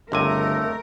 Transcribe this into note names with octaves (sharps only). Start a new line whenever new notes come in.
G1 C#2 C3 A3 A#4 G#5